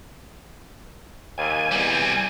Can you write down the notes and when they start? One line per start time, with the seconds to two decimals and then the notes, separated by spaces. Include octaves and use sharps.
1.38 D#2 G#5
1.72 E2 G3 C4